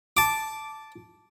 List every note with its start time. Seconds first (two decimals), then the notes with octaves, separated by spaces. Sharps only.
0.17 A5 D6